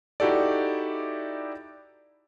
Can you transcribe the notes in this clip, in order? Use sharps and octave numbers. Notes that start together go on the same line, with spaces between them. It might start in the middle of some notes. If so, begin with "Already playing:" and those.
D#4 E4 F#4 G4 A4 D5